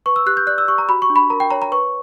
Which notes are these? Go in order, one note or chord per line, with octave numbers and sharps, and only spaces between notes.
B4 C#6
E6
G4 F#6
G6
D5 F#6
E6
G4 C#6
A#5
F#4 B5
C#6
D4
B5
A#4 A#5
G5
C#5 A#5
A#5
B4 C#6